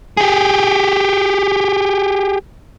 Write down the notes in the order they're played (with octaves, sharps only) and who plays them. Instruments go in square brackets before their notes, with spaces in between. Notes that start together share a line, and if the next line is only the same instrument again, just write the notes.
[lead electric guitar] G4 G#4